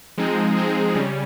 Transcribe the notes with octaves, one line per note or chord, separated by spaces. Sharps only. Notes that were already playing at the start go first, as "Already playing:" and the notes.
F3 G#3 C4 D#4 G#4
F3 G#3 C4 D#4 G#4
C#3 G3 C#4